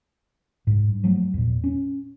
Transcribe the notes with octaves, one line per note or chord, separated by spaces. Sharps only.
G#2
G2
F3 F#3 A3
E2 A#2
C#4